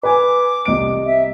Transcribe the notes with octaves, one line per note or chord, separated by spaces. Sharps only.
B4 G#5 D6
C2 D#5 D7
E5